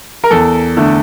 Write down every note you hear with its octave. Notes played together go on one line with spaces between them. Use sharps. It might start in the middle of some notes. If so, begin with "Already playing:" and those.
A#4
E2 A4
D3 A3